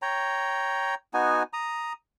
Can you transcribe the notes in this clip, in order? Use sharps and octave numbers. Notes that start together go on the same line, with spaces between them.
C#5 G5 A#5
B3 D#4 F#4 G#5
A#5 D#6